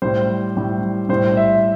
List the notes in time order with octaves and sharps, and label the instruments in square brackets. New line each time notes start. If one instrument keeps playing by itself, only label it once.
[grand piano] A2 G3 C5
A2 G3
A2 G3 C5
E5